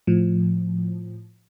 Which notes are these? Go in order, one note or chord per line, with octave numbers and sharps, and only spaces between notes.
A2 F3